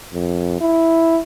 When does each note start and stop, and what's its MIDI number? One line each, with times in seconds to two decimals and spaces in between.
0.13 0.58 41
0.61 1.19 64